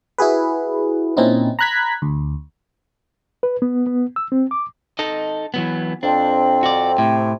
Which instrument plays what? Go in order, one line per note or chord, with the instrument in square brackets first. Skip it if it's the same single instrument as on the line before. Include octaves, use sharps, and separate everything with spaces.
[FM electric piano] E4 F#4 G#4 B4
A#2 C4 C#4 D#4 E4
A#5 B5 F#6 G#6 B6
D2
[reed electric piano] B4
B3
B3
E6
C4
D6
[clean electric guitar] D#4 A4 D#5
E3 F#3 B3
[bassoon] F2 [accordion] C4 [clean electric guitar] D4
[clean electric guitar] F#4 D5
[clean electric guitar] A2 [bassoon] C3